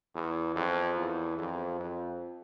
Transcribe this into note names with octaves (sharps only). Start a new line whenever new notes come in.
E2
F2
E2
F2
F2